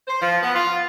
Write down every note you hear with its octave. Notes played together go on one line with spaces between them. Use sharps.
C5
F3
B3
F4